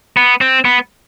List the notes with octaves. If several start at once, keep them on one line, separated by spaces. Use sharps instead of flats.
B3
C4
B3